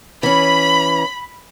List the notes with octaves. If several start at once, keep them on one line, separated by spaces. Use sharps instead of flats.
E3 C#4 B5